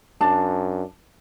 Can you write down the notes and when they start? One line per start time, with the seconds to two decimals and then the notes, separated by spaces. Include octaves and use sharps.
0.21 F#2 D4 A5